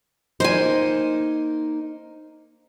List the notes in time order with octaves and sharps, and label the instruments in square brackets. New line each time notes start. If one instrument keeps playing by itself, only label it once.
[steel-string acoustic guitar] A#3 D#4 [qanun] C5 G#5